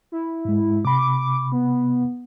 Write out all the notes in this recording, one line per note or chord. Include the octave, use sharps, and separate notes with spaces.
E4
G#2 G#3
C3 B5 D6
B3